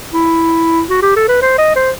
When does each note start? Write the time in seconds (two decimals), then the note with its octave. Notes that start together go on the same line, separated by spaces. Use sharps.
0.13 E4
0.89 F#4
1.02 G4
1.16 A4
1.28 B4
1.42 C5
1.58 D#5
1.76 C5